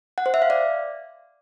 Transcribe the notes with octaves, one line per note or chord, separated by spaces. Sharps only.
F#5
C5
E5
F5
D5